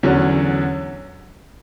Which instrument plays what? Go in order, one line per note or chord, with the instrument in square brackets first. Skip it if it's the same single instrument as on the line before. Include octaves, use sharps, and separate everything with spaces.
[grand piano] E2 D3 F#3 C#4